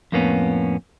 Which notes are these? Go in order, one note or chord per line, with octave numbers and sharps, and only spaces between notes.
F2 A2 A#3 B3 C#4